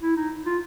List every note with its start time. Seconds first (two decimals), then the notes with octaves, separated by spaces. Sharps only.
0.01 E4
0.16 D#4
0.46 F4